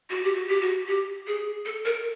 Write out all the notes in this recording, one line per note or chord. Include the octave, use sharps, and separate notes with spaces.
F#4
G4
F#4
G4
F#4
G4
G#4
A4
A#4